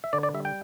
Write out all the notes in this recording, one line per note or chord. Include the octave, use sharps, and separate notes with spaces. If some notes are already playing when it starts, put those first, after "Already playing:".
E5
D3 D5
D5
G3 E5
G5